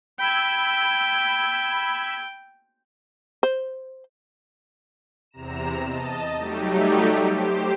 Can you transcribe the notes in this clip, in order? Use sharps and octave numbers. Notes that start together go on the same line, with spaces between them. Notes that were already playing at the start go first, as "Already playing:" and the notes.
G5 B5 E6 G#6
C5
E2 C3 A#5 E7
D#5 A5
F#3 G3 A3 D#4 G4
G4 C5